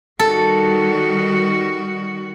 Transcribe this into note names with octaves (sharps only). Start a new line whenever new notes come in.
D#3 G3 F#4 A4